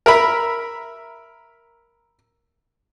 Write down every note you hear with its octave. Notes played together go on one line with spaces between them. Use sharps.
A#4 E5 B5